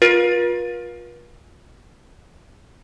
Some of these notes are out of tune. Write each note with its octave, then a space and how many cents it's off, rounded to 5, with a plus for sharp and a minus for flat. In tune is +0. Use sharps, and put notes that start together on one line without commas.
F4 +25 B4 -45